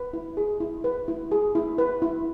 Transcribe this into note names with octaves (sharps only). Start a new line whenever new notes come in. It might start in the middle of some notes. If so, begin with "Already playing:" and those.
Already playing: B4
E4
G#4
E4
B4
E4
G#4
E4
B4
E4